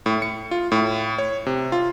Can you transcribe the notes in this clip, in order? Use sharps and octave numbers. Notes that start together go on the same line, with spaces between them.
A2
C#7
F4
A2
C#5
C3
F4